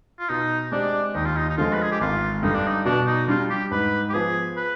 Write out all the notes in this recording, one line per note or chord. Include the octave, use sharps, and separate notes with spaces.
F4
B2 D#4
G#3 C4 D4 G4 D5
D#2 D#4
F4
D#4
D#4
D3 F3 G#3 F4
B4
G#4
G4
G#1 F4
G2 D3 D#4
D4
D#4
B2 D4
D#4
G3 D4 F4
G4
G#2 B4
G4
F3 B3 G#4
B4